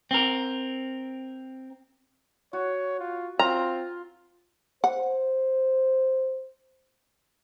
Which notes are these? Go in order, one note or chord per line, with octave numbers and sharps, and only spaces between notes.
C4 A#4
F#4 C#5
F4
C4 F4 A#5
C5 F#5